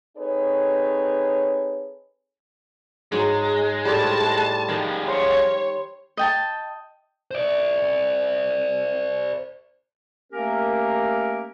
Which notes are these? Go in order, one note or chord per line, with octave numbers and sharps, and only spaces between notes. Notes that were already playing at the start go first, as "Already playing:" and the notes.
C4 D#4 G#4 A4 B4 C#5
G#2 F#3 G#3
A2 G3 F4 C5 D5 A5
D#3 F3 G#3
C5 C#5
D#5 G5 A5
C5 D5
A3 A#3 C#4 G4 A#4